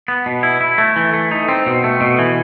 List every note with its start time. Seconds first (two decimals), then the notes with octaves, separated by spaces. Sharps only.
0.08 B3
0.26 B2
0.43 E4
0.61 E4
0.78 A3
0.96 E3
1.14 A3
1.31 D#4
1.49 C4
1.67 B2
1.84 A3
2.01 B2
2.19 E3